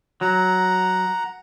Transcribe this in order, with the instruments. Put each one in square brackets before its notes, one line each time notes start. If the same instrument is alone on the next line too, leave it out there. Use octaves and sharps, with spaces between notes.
[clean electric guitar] F#3 [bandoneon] F#5 A#5